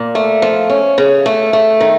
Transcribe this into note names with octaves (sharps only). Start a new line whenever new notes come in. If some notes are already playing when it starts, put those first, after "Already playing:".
Already playing: A#2
A3
F3
C#4
C#3
A3
A3
D#3